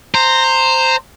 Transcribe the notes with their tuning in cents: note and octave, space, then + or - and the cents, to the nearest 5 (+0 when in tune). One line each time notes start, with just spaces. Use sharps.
C5 +0 A#5 -15